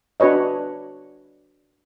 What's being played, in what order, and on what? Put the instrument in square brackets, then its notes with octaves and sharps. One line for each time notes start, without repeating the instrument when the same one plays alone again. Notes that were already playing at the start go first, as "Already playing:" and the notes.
[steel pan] D4 F#4 B4 C#5 D#5